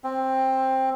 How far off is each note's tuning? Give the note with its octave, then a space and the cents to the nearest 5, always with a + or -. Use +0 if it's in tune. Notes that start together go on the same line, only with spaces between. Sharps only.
C4 +10